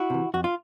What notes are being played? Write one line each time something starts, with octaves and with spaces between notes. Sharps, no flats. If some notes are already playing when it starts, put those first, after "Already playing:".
Already playing: E4 F#4
C3 E3
F2 F#4
F4